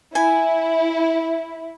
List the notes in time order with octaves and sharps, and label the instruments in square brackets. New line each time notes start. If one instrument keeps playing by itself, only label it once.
[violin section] E4 [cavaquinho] G#5